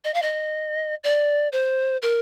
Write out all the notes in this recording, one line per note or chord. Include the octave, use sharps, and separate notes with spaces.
D#5
F5
D#5
D5
C5
A#4